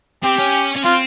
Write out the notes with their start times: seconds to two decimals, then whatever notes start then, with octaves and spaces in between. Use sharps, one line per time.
0.24 C4 G4
0.39 C#4
0.76 C#4
0.85 C4 F4